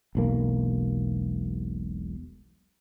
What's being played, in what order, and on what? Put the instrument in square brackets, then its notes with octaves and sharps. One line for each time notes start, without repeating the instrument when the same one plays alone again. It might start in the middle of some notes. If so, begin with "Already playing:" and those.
[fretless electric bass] E1 B1 A#3